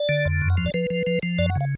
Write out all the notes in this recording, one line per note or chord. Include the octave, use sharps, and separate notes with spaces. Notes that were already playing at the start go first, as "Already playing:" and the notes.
Already playing: D5
D3
F2
F#2
F#5
F3
D5
F3 B4
F3
F3
F3
F#2 D5
F#5
C#3
F5